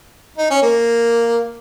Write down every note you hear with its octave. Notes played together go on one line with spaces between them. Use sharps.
D#4
C#4
A#3